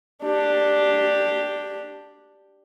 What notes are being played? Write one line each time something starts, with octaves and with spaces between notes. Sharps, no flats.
D4 G4